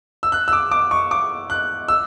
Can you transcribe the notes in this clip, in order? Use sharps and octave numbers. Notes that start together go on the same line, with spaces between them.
E6
F#6
E6
D6
D6
C#6
D6
F#6
E6